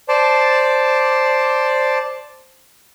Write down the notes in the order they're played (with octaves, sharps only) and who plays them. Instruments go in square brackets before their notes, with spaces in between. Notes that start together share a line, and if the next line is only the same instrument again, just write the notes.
[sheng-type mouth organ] C5 D5 A5